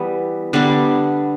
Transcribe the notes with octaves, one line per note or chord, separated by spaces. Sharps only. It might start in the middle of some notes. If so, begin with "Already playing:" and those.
Already playing: E3 G3 B3
D3 G3 B3 D4